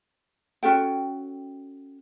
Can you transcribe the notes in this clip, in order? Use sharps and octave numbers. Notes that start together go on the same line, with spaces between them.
C#4 F#4 A4 G5